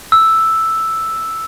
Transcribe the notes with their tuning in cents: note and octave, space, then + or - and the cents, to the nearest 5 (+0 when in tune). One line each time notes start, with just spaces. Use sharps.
E6 +0